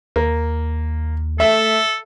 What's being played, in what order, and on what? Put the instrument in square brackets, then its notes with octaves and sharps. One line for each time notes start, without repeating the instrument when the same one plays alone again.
[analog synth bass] D#2 [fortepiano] A#3
[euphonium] A3 [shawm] A4 [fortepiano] E5